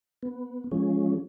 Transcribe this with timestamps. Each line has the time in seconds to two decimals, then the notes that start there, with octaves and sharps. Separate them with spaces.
0.23 B3
0.71 F3 G#3 C#4